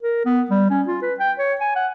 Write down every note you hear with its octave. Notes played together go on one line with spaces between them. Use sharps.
A#4
B3
G3
C#4
F4
B4
G5
C#5
G#5
F#5